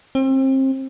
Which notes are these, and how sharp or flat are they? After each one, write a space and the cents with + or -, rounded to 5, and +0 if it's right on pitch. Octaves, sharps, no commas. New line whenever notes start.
C4 +30